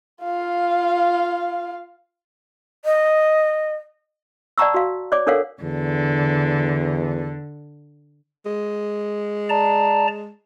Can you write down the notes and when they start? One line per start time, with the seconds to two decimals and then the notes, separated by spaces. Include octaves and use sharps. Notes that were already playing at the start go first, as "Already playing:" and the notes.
0.23 F4 F5
2.85 D#5
4.58 D5 F#5 A5 A#5 C#6 E6
4.74 F#4 F5
5.12 C#5 D5 D6
5.27 D4 A4 A#4 C#5 F5 F#5
5.62 E2 D3
8.46 G#3
9.49 D5 A5 A#5